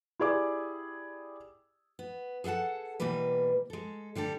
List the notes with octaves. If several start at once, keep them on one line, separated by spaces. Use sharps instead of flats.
E4 G4 G#4 D5 D6
B3
G#4 A4 F5 F#5 A5
B2 E3 G3 A#3 B4
G#3 A4
D3 G3 G4 A4